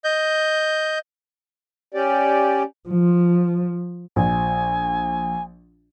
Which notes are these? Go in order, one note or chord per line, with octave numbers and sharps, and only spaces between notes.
D#5 G6
C#4 G4 D5
F3
A#1 G#5